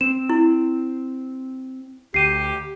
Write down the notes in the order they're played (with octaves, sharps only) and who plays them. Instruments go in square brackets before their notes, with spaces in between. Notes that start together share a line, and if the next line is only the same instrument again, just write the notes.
[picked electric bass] C4 [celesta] E7
[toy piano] E4
[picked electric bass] D2 [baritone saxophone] G4 [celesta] C7 D#7